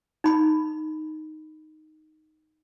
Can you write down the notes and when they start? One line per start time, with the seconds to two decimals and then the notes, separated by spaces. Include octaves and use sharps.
0.24 D#4 B5